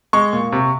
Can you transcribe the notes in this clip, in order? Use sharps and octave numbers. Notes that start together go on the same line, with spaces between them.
G#3 C#6
A#2
C3